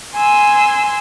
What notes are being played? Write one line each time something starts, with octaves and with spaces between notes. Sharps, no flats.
G#5 C6 E6